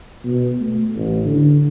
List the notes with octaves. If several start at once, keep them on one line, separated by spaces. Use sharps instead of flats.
B2
A3
A1
D3